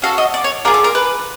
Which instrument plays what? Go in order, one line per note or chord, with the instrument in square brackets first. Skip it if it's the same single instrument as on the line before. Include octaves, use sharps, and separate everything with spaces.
[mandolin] C#4 F#4 A4 F5
D#5
D5
C#5
D4 F4 G#4 A#4
A4
A#4
B4